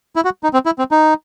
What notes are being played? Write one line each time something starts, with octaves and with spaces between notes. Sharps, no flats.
E4
F#4
D#4
C4
E4
C4
D#4